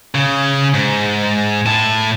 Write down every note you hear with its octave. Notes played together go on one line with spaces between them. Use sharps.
C#3
G#2
A2 A5